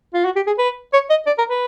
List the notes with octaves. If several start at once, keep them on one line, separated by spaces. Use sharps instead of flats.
F4
F#4
G4
G#4
B4
C#5
D#5
D5
A#4
B4